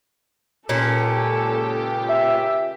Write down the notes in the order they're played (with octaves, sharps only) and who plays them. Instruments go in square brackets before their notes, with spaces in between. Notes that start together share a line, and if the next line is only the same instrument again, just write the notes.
[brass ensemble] C#2 G4 [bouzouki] A#2 C#4 [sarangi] A4
[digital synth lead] E5